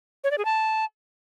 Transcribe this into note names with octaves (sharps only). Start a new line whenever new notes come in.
C#5
D5
G#4
A5